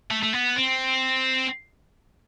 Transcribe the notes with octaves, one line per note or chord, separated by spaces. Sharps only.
A3
A3
B3
C4